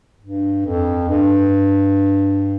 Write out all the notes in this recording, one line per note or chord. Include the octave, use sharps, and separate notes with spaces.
G2
F2
G2